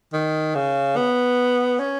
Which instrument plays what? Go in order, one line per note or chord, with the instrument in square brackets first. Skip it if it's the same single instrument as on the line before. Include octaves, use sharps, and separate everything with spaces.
[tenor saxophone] D#3
C#3
B3
C#4